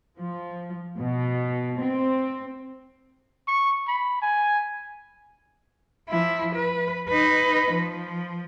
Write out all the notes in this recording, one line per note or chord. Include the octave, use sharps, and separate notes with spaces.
F3
B2
C4
C#6
B5
G#5
F3 E4
B4
D#4 B4
F3